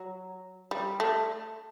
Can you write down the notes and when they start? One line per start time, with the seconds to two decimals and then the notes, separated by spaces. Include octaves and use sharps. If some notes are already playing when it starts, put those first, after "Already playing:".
Already playing: F#3
0.71 G3
1.00 A3